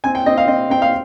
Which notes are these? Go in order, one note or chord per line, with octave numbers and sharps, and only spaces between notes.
C4 G#5
G5
C4 D#5
F5
C4 D#5
C4 G5
F5